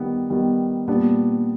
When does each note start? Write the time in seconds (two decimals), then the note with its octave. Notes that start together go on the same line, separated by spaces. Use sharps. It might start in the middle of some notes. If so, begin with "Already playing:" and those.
Already playing: D#3 G3 B3
0.30 D#3 G3 B3
0.88 A#2 G3 B3 D4